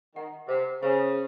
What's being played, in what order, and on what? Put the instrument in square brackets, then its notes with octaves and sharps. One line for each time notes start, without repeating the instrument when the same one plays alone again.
[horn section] D#3 [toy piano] F#5
[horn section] C3 [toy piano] C5
[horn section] C#3 [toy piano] C5